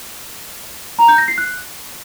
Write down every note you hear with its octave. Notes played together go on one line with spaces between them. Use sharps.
A#5
G6
A#6
C7
F#6